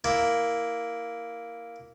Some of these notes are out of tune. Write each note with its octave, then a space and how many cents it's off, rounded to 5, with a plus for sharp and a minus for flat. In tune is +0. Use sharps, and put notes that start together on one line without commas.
A#3 +0 E4 +0